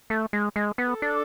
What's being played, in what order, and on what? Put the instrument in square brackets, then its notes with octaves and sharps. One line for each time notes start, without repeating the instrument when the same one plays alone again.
[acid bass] A3
G#3
G#3
B3
[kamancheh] A4
[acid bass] D4